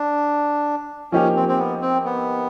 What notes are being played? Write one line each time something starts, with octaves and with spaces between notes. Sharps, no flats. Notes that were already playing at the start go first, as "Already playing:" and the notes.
Already playing: D4
F3 A#3 C#4 D#4 G4
C4
C4
B3
C4
B3